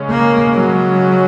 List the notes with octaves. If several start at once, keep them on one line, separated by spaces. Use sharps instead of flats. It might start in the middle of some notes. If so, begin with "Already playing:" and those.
Already playing: C#3 G#3 C#4
A#3
F#3